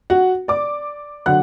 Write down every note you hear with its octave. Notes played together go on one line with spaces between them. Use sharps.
F#4 F#5
D5 D6
D3 F#3 F#5 F#6